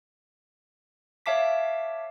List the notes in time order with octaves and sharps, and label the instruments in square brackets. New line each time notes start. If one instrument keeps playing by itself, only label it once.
[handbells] C#5 E5 F5 A5 D6 B6